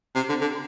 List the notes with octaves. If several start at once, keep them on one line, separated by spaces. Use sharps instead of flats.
C3
D3
D3